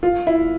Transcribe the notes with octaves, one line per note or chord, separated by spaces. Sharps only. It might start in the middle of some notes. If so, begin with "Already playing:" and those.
F4
E4